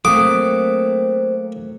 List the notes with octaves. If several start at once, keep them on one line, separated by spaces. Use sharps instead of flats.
F#3 A3 A#3 C4 D6 D#6